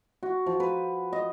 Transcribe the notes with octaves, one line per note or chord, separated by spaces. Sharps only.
F#4
F3
B4
D#5